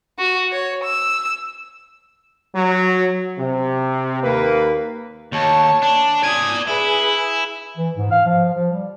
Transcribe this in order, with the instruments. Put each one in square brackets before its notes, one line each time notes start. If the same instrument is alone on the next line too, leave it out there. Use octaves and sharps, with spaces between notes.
[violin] F#4
C#5
E6
[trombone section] F#3
C3
D#2 A#3 B4
[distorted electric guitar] D#2 [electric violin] C#5 A5
[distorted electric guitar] D4
[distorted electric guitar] D5 G#5 [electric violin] D#6 G#6
[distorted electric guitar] E4 [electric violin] G#4 B4
[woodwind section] E3
G#2
F5
F3
F3
G3